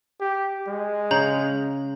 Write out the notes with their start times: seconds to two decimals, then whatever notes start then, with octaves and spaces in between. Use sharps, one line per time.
0.20 G4
0.68 G#3
1.11 C#3 A#5 G6 F#7